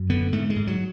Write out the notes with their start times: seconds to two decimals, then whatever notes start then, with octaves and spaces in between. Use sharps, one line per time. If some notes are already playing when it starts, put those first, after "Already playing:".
Already playing: F#2
0.10 D3 B3
0.32 G#2 A3
0.50 G#3
0.56 G#2
0.67 F#3